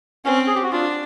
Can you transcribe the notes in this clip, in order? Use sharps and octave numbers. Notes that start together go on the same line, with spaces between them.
C4 C#4
G#4
G4
F#4
D4 F4